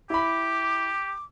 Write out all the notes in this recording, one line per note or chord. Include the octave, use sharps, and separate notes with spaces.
E4 G4 B5 D6